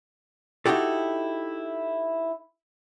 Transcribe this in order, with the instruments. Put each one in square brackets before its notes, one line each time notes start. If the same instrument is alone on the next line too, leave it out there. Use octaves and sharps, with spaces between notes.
[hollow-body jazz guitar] D#4 E4 F#4 G4 A4